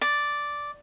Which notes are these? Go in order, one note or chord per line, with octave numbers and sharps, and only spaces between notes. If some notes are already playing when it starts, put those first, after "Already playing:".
D5